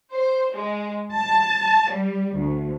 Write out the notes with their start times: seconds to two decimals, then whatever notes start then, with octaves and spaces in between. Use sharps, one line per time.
0.12 C5
0.54 G#3
1.12 A5
1.90 G3
2.35 D2